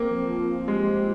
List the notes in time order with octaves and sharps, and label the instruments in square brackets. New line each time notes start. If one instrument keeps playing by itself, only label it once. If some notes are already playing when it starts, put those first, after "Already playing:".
Already playing: [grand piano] A#3 [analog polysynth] C4
[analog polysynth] F3
F3
[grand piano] G#3 [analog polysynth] G4
[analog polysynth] C4